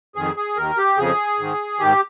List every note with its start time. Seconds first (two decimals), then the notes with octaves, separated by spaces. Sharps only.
0.15 F2 D#3 G#4
0.36 G#4
0.57 D#2 D#3 A#4
0.78 G4
0.97 F2 C#3 F3 G#4
1.39 G#2 D#3
1.79 G#2 D#3 G4